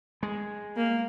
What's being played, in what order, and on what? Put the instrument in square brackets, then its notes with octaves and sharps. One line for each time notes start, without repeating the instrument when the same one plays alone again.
[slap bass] G#3
[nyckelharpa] A#3